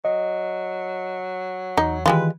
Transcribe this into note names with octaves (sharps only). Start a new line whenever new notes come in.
F#3 D#5
E2 D#4
D#3 E3 G3 G#3 F4 B4